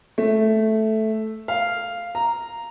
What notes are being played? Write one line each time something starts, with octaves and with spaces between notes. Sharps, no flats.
A3
F5
A#5